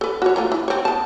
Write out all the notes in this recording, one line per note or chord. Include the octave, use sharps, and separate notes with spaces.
A4 B4
F#4 C#5
A3 F4 A#5
E4
C4 C#5
B3 A5